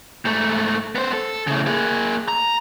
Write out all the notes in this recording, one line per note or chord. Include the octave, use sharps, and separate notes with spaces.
G#2 A3
B3 C5
A4
A2 C#3
A#3 G#4
A#5